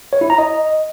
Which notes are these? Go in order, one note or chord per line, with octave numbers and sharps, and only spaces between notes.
C#5
E4
A#5
D#5